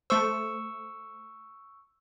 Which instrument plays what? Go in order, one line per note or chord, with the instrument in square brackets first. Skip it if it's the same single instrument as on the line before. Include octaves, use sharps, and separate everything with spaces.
[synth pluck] A3 C5 [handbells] C#6 E6